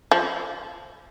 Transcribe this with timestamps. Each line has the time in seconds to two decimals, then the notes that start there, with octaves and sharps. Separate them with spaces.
0.11 F3